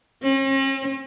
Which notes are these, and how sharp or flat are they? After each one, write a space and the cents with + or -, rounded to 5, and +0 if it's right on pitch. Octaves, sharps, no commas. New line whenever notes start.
C#4 -45